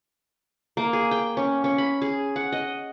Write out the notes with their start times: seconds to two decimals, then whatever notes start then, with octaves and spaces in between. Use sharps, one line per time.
0.77 A#3
0.93 G#4
1.11 G5
1.37 C#4
1.64 C#4
1.78 B5
2.02 G#4
2.36 F#5
2.52 D#5